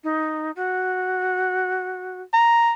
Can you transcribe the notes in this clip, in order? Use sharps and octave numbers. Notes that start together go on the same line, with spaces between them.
D#4
F#4
A#5